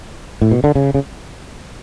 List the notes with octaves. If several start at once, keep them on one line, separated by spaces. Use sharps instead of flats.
A2
B2
D3
C#3
C#3